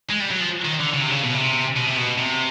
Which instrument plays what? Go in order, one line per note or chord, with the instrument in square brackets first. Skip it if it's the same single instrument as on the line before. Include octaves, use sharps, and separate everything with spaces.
[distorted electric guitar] G#3
G3
F#3
F3
D#3
D3
C#3
C3
C#3
B2
C3
B2
C3
B2
C3